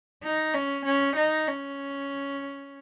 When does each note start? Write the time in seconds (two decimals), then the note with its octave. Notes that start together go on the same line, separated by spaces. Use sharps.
0.23 D#4
0.54 C#4
0.85 C#4
1.16 D#4
1.48 C#4